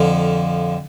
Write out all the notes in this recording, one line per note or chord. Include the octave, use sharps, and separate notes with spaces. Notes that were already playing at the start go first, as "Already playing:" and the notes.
Already playing: F2 D3 F3